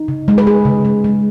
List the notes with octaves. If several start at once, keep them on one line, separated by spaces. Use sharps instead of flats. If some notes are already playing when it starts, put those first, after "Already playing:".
Already playing: D#4
C#3
G#3
B4
G#3 G#4
C#3
G#3
G#3